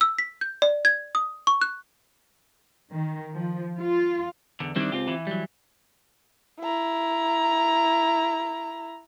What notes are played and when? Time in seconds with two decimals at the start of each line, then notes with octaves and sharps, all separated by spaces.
0.01 E6
0.19 B6
0.41 G6
0.62 D5
0.85 G#6
1.15 D#6
1.47 C#6
1.62 F#6
2.92 D#3
3.34 F3
3.80 F4
4.60 E2 D3
4.76 D#3 G3 C4 D4 E4
4.92 C#2 C4 F4 G4
5.08 E3
5.27 F#3 G3
6.60 E4 A#5